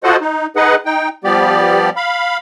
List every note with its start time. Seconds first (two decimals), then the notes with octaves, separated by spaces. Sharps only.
0.04 F4 F#4 A4 C5 D#5 F#5
0.21 D#4
0.56 D#4 G#4 B4 D#5 F#5
0.86 D#4 G5
1.24 F3 G3 B3 G4 D5
1.96 F5 B5